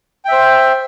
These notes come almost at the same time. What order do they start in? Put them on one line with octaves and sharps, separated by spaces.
G5 E5 C5